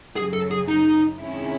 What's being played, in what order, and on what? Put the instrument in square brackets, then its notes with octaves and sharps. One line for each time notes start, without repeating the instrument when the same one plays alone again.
[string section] F#2 C#3 F#3 [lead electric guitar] G#4
[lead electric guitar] A4
G#4
D#4
[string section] C3 D#3 G#3 C#4 E4